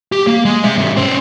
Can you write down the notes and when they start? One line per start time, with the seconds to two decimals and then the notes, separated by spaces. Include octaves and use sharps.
0.12 G4
0.27 A#3
0.45 G#3
0.64 C3 E5
0.78 G#2 C3
0.97 C#4 C5